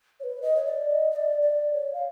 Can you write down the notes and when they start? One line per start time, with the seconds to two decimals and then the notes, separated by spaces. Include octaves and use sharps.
0.20 C#5
0.24 B4
0.42 D#5
0.56 C#5
0.66 D5
0.89 D#5
1.11 D#5
1.16 D5
1.42 D5
1.73 C#5
1.93 F5